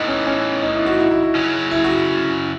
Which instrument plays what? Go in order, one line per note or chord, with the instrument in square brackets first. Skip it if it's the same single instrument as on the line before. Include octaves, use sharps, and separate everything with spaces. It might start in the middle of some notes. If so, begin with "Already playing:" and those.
Already playing: [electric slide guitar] A2 E3 B3 [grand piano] D#4
[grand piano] C#4
C#4
D#4
E4
F#4
E4
E4
E4
[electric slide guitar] C#3 F#3 C#4
[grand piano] E4
F#4